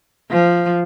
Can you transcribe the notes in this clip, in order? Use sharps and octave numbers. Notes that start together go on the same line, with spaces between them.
F3